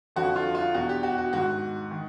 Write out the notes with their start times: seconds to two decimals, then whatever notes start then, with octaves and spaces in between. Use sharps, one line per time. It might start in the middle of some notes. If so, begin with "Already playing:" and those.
0.16 F2 D3 F3 F#4
0.36 F4
0.55 F4
0.74 E2 B2 F#4
0.89 G4
1.03 F#4
1.18 F#4
1.33 G#2 D#3 F#4
1.91 D#3